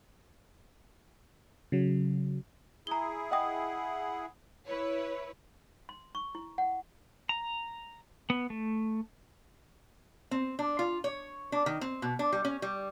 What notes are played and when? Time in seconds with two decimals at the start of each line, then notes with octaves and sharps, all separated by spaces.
1.72 C#3 F#3
2.87 E4 G#4 A#5 G7
3.31 D#5 F#5 G5 D#6
4.66 E4 B4 C#5
5.89 C6
6.15 C#6
6.35 E4
6.58 F#5
7.29 A#5
8.30 B3
8.50 A3
10.31 C4
10.59 D4
10.79 F4
11.04 C#5
11.52 D4
11.66 D#3
11.81 C4
12.02 B2
12.19 D4
12.33 G3
12.45 C#4
12.62 G3